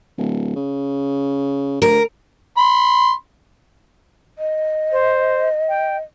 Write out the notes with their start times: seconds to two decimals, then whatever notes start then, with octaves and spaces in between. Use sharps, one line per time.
0.18 D1
0.56 C#3
1.82 D2 A#4
2.57 B5 C6
4.38 D#5
4.92 C5
5.69 G5